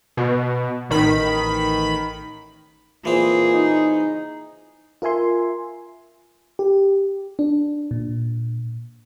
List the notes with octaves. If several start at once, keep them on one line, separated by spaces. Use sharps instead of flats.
B2
A1 D#3 B5
A#2 E3 C4 G#4
D#4
F4 A#4 E5 G#5 C6
G4
D4
A#2